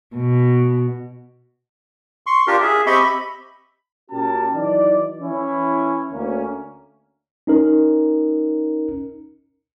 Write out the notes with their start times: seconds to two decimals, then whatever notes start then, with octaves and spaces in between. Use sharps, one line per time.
0.16 B2
2.26 C6 C#6
2.47 D4 F4 G4 A#4
2.62 G#4 E5
2.87 C4 G4 D#5 E5 B5 C#6
3.00 B5
4.11 A#2 C#4 F#4 G4 A#4 A5
4.54 E3 F#3 D#4 D5
5.21 E3 C#4 E4
6.11 D2 A#3 C#4
7.47 C#4 D#4 A#4